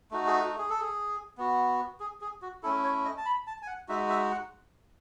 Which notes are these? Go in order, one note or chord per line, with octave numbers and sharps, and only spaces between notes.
A3 D#4 F#4
G#4
F#4
G#4
A4
G#4
B3 F#4
G#4
G#4
F#4
A3 C#4 E4 A4
C#5
D#5
A5
B5
A5
G#5
F#5
G#3 D#4 F#4 E5
E5
F#5